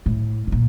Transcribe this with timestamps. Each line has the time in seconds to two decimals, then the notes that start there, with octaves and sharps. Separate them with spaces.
0.06 A2
0.47 A2
0.52 A#2